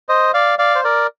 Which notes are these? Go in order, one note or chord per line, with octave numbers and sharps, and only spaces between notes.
C5 D#5
D5 F5
D5 F5
C5
A#4 D5